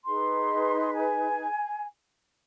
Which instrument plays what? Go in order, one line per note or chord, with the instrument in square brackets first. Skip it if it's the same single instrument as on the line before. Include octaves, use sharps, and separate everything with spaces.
[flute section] D#4 G#4 B4 C6
G#5